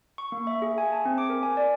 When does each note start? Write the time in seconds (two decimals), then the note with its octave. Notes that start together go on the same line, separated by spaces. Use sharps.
0.18 C#6
0.32 A#3
0.47 E5
0.62 G#4
0.78 G#5
0.92 A5
1.05 C4
1.18 D6
1.30 A#4
1.43 G#5
1.57 D5